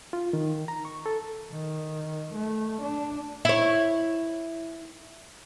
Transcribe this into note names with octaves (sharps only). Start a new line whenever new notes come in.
F4
D#3
A#5
C#6
A4
D#3
A3
D4
E4 C#5